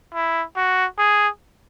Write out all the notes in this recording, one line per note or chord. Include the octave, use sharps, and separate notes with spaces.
E4
F#4
G#4